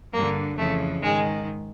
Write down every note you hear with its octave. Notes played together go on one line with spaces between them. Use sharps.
G2 D3 A#3
F2 C#3 E3 A3
G#2 D#3 G#3